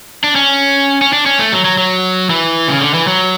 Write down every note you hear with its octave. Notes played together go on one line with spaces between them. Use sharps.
D4
C#4
C#4
D4
C#4
A3
F#3
F#3
F#3
E3
C#3
D3
E3
F#3